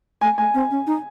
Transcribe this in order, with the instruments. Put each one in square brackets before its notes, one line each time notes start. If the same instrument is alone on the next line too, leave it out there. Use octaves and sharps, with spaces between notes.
[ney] A3 [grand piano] G#5
[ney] A3 [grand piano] G#5
[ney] C4
C#4
D#4